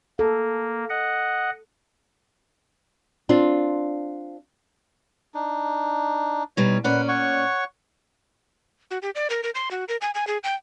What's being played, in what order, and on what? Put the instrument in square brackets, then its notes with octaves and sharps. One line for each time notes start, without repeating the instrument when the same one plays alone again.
[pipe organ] A#3 [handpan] A4
[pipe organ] D#5 F#5
[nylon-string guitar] C4 D4 F4
[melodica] D4 D#4
[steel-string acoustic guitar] B2 G3 D#4 [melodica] C#5
[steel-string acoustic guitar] A#2 C#4 D5 [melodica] B4 F#5
[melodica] C#5 F#5 C#6
[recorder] F#4
G4
D5
A#4
A#4
C6
F#4
A#4
G#5
G#5
G#4
G5